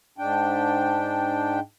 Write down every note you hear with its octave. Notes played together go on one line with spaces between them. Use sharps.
G#2 D4 G5